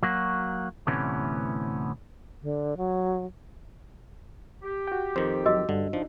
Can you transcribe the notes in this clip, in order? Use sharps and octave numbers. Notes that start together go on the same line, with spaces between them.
F#3 A#3 F#4
D2 A2 C3 E3 B3 C#4
D3
F#3
G4
F#4 G5
F2 D#3 C5
E2 F#3 F#4 D#5 E6
G2 D3
F3 D4 D#4